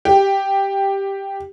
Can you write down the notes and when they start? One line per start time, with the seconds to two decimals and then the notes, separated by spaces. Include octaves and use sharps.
0.05 G4